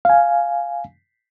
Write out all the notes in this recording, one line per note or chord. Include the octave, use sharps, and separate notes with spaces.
F5 G#5